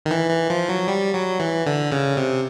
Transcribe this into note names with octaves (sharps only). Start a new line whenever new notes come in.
D#3
E3
E3
F3
F#3
G3
F#3
E3
D3
C#3
C3